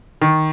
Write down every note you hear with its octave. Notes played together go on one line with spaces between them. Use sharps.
D#3